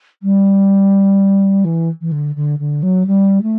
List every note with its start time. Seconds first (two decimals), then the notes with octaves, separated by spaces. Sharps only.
0.23 G3
1.64 E3
2.01 E3
2.12 D3
2.36 D3
2.59 D3
2.83 F#3
3.07 G3
3.42 A3